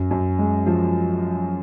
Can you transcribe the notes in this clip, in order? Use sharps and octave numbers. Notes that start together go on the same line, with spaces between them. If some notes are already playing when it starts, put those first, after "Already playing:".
Already playing: F#2
F#2
G#3
F3